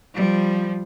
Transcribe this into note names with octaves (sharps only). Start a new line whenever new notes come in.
F3 G3